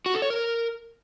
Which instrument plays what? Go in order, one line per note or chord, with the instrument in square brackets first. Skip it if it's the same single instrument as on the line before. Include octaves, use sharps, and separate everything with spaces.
[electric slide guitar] F#4
A4
C#5
A#4